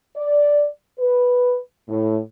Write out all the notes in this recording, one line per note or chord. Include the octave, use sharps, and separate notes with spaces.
D5
B4
A2